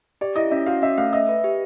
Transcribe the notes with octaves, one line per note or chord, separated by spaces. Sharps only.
G4 D5
E4 D#5
C#4 E5
F#4 F5
C#4 E5
A3 F5
D#5 E5
B4
G4